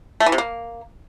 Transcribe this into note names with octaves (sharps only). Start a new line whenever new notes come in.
A3
E3
C3
A#3